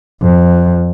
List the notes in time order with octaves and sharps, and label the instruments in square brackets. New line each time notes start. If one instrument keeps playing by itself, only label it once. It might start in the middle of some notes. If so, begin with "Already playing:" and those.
[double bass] F2